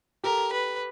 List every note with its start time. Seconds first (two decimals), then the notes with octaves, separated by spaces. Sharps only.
0.24 G4 A4 A#4
0.53 B4